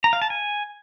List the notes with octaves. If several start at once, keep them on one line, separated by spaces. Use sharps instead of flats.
A#5
F5
A5
G#5